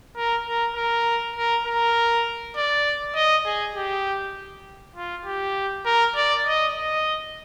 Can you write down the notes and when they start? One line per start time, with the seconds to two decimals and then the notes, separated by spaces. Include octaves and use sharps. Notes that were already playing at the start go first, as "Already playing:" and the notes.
0.16 A#4
0.46 A#4
0.76 A#4
1.36 A#4
1.66 A#4
2.56 D5
3.16 D#5
3.46 G#4
3.76 G4
4.96 F4
5.25 G4
5.86 A#4
6.16 D5
6.46 D#5
6.76 D#5